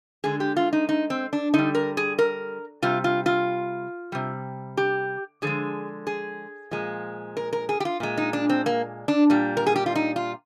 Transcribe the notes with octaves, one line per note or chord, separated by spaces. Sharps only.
D3 G#3 G#4
G4
F4
D#4
D#4
C4
D4
D3 G3 D#4
A#4
G#4
A#4
C3 G3 F4
F4
F4
C3 G3
G4
D3 F3 G#3 G#4
G#4
A#2 F3 G#3
A#4
A#4
G#4
G4
F4
A#2 G#3
D#4
D4
C4
A#3
D4
A#2 G3
A#4
G#4
G4
F4
D#4
F4